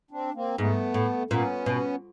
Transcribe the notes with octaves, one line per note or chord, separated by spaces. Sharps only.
C4 D4
A#3 C4
G#2 A3 B3
A2
A#2 B3 C#4
B2